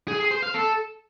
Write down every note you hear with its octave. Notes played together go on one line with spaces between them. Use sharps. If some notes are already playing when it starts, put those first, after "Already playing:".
G#4
G#4
C5
F5
A4